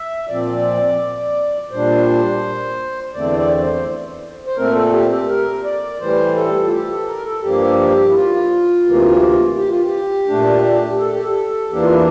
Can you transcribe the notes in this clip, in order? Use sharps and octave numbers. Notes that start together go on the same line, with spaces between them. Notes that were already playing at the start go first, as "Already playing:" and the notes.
Already playing: E5
A#2 F3 C4 D5
A#2 G3 D4 C5
E2 D3 A3 C4 D5
D5
C5
C5
A#2 A3 C4 A#4
A4
G4
G4
A#4
D5
A2 E3 G3 C5
A4
F4
G4
A4
A#4
A4
G2 F3 A#3 G4
E4
F4
D2 C3 E3 A#3
G4
F4
G4
A#2 A3 D4
A4
G4
A4
E2 E3 A#3 D4 G4
F4
E4